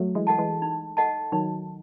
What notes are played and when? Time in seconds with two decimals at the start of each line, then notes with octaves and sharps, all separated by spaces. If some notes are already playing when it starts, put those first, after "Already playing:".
Already playing: F#3 A3
0.15 E3 G#3
0.27 A4 D#5 F#5 A5
0.38 E3 G#3
0.62 D#4
0.97 A4 D#5 F#5 A5
1.32 D#3 F#3 D#4